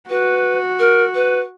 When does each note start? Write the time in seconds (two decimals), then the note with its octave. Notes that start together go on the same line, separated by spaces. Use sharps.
0.10 F#4 B4
0.79 A#4
1.15 B4